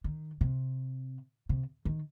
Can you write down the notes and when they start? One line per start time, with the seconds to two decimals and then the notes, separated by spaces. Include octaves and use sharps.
0.04 D#3
0.41 C3
1.49 C3
1.85 D#3